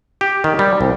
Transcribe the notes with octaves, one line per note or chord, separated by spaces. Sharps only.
G4
D#3
G3
C2